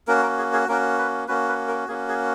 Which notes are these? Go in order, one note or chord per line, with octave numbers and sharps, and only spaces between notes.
A#3 C#4 F#4 A#4
A#4
G#4
G#4
A#3 C#4 F#4 A#4
B4
A#3 C#4 F#4 B4
B4
A#4
A#3 C#4 F#4 G#4
G#4